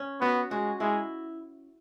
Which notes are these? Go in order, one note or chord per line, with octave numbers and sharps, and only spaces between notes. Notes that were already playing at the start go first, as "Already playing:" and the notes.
Already playing: C#4
B3 F#4
G#3 F#4
G#3 E4